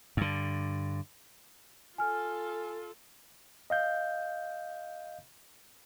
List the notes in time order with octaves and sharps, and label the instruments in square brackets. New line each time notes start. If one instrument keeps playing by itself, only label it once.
[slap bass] G2 D3
[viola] F4 A4 [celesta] G#5 F6
[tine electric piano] D#5 F5 G6